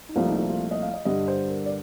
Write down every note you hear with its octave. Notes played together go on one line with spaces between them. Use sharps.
D#4
C2 A#2 F3 A3 F4
D#4
F4
F4
D#5
F5
D#5
G2 D3 G3 D#5
C5
A#4
D5